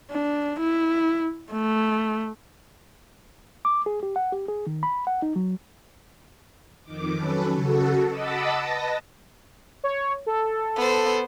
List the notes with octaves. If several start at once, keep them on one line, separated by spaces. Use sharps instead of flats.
D4
E4
A3
D6
G#4
G4
F#5
G4
G#4
D#3
B5
F#5
D#4
F#3
F2 D#3 D6
F#3 C#4 A4 B4
C#3 F#4 A4
D#5 F#5 A5 B5 D6 E6
B4 D#5 A5 A#6
C#5
A4
B3 C5